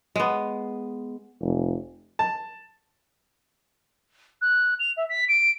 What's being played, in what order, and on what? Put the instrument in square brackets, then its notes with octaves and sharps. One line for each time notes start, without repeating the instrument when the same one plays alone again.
[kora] G#3 B3
[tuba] F1
[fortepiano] A5
[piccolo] F#6
F7
E5
B6
D7